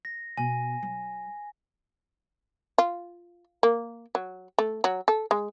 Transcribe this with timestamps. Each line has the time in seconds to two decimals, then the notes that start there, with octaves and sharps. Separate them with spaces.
0.05 A#6
0.37 B2 B3 G#5
0.83 F#3
2.78 F4
3.63 A#3
4.15 F#3
4.58 A3
4.84 F#3
5.08 A4
5.31 G#3